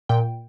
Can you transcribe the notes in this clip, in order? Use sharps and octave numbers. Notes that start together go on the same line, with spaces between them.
A#2 G5